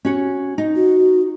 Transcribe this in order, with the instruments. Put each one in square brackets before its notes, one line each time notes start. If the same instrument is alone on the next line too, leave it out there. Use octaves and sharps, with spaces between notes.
[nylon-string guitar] C#4 F#4 C#5
D#4
[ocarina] F#4